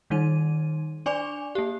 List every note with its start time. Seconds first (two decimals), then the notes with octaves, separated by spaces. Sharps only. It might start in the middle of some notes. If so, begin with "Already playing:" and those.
0.10 D#3 G3 D#4 D#7
1.06 D4 D5 G#5 D6 F7
1.55 A#3 G4